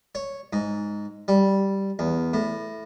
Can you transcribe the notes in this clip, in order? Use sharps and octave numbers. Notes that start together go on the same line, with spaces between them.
C#5
G#2
G3
E2
A2